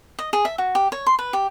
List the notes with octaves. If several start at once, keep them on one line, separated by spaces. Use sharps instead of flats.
D#5
G#4
E5
F#4
G4
C#5
C6
B4
G4